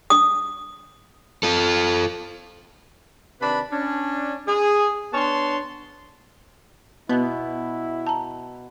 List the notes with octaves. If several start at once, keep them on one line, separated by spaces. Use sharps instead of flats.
D#6
F4 A4
C3 D#3 D4 B4 B5
C#4 D4
G#4
B3 D4 C#5 A5 C6
B2 B3 E4
A5 A#5